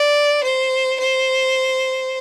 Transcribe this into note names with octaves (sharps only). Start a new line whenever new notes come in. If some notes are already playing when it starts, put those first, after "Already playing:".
Already playing: D5
C5
C5